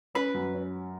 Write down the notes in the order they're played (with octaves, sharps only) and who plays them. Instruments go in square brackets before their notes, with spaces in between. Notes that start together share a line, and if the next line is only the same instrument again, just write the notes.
[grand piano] C#4 [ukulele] B4
[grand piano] F#2
C#4